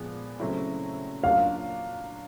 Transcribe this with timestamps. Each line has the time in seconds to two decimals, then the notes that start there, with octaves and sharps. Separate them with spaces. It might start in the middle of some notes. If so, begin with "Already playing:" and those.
Already playing: A#2 F3 G#3 B3
0.40 C#3 F#3 A3 C4 E4
1.23 F#3 A#3 D4 F4 F5